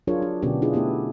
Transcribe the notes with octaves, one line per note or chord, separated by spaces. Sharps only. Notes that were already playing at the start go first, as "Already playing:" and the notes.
F#3 D4 F4 G#4 A#4 C#5
D4
B2 D3 B3 C#4 D4 G4
D4 E4 F4 G#4 B4 D#5
A3 B3 E4 G4